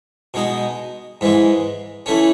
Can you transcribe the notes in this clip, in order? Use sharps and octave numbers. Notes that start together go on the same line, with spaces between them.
B2 G#3 D#4
G#2 E3 G#3
E3 A3 C#4